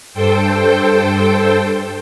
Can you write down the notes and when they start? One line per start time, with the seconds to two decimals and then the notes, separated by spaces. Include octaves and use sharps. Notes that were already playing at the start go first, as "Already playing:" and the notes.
0.14 G2 A4 C5 G5